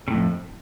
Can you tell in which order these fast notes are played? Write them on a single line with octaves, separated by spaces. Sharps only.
C#3 A2 F2